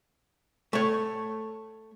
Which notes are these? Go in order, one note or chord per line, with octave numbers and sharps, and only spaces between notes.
A3 C#5